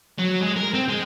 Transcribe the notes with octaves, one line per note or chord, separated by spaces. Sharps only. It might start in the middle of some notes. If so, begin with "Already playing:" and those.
F#3
G#3
A#4
C4
G#3